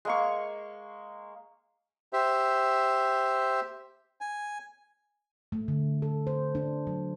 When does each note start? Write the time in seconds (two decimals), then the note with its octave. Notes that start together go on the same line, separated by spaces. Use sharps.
0.05 G#3 A#3 C#6
2.13 G4 C5 E5
4.21 G#5
5.52 A3
5.68 D3
6.02 A4
6.27 C5
6.55 D4
6.87 F#3